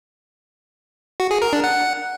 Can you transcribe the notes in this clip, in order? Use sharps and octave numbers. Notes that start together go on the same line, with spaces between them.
F#4
G#4
A#4
D4
F#5